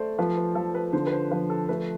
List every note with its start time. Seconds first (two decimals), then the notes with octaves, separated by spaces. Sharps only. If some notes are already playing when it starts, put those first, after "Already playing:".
Already playing: A3 C5 D5
0.19 F3 B4
0.37 B4
0.55 F3 A4
0.75 B4
0.93 D3 C5
1.07 B4
1.12 C5
1.31 F3 B4
1.50 A4
1.69 A3 B4